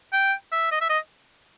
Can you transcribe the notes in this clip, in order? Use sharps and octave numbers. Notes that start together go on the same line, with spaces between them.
G5
E5
D#5
E5
D#5